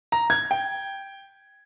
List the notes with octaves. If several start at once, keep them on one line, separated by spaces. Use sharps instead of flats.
A#5
G#6
G5